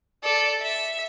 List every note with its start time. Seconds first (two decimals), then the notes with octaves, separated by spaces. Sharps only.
0.24 A4 D5
0.62 E5